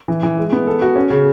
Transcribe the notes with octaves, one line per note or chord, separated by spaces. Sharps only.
E3
E3
G#3
B3
A4
F#4
C#4
C#3